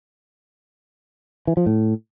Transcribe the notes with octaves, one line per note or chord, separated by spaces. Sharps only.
E3
F3
A2